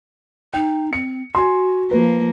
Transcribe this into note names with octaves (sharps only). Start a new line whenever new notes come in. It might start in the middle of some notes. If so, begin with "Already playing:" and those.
D#4 G5
C4 C#7
F#4 G#5 C6
F3 A#3 B4